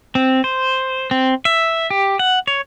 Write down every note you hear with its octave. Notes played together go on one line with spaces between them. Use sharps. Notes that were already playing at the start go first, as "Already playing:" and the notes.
C4
C5
C4
E5
G4
F#5
C#5